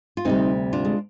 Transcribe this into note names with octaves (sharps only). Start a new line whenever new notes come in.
F4
D2 C3 G3 C4 D#4
D4 F4
G#3